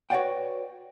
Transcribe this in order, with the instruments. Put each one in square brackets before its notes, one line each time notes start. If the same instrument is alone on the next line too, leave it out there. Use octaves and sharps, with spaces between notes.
[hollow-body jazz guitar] F#4 B4 C#5 D5 F#5 G5